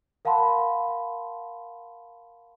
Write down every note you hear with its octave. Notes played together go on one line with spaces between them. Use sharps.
A#4 F5 F#5 A5 B5 C6